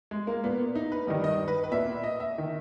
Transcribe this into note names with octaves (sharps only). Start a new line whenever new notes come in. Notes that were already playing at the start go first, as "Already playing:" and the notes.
G#3
A#3
A#2 B3
D#4
B4
G2 D#3 D#5
D#5
B4
B4
A#2 E5
D#5
E5
D#3